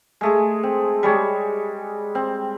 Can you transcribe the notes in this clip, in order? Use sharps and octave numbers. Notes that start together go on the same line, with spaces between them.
G#3 A3 G#4
C4
G3 G#3 C#5
C4